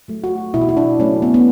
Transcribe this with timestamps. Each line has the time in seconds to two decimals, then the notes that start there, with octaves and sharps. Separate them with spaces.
0.08 F#3 A3
0.24 F#4
0.54 B2 E4
0.61 F#4
0.69 E4
0.77 D4
1.00 F#3 A3 C#4
1.22 B3
1.34 B3